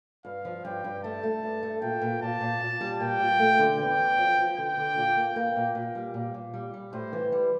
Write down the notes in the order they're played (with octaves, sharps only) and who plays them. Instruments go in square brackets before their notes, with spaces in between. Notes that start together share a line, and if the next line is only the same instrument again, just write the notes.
[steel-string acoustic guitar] G2 [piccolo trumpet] F5
[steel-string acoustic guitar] F3
[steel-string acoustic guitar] G2 [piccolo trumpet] G5
[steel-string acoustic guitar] G2
[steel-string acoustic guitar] A3 [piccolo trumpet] A5
[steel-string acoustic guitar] A3
G2
A3
[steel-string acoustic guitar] A#2 [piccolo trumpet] G5
[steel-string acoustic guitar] A#2
[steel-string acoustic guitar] A#2 [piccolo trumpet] A5
[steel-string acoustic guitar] A#2
A#2
G3
[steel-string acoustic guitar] A#2 [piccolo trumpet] G5
[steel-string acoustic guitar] A#2
A3
D3
[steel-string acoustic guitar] E2 [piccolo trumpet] G5
[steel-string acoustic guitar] E2
F3
F3
[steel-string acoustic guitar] D3 [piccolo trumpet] G5
[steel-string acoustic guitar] D3
A#2
A#3
[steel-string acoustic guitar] A#3 [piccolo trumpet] G5
[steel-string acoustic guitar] A#2
A#2
G3
A#2
A#2
G3
G3
[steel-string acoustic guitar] A2 [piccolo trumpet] C5
[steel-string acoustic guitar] E3
G3